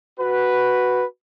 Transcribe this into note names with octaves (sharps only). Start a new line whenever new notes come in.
F#4 B4